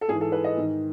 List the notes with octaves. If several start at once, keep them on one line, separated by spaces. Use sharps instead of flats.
A4
G#2 E3 G#4
A4
B4
D#5
G#2 D#3